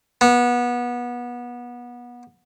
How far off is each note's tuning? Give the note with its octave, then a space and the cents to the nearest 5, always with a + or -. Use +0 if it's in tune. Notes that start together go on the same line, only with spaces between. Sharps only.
B3 -25